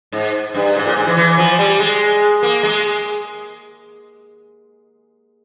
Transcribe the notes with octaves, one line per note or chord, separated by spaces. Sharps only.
G#2
G2
G#2
A#2
G#2
E3
E3
F3
G3
G#3
A#3
G#3